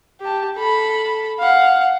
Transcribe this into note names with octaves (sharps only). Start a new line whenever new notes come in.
G4 A5
A4 B5
F5 F#5